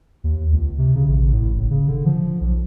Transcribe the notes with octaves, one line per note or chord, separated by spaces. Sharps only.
D#2
C#2
C3
C#3
A1
A2
F#1
C#3
D3
F3
B1